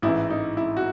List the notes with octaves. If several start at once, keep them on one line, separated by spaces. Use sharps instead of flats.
A1 G#2 E3 E4
D#4
E4
F#4